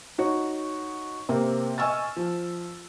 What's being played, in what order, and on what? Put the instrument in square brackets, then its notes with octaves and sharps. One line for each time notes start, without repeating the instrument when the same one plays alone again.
[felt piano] D#4 F#4 C#5
C3 A#3 C4
D#5 G#5 C#6 E6 F6 A6
F3